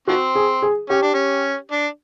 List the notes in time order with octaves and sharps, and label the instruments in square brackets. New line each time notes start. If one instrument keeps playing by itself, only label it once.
[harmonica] D#3 F3 C4 [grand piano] F#4
[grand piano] G#4
G#4
[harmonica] C#4 [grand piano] G4
[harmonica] D4
C#4
D4